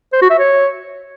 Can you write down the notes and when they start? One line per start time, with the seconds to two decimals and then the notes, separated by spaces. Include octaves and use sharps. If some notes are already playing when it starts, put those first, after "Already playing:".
0.13 C5
0.22 F#4
0.30 E5
0.39 C#5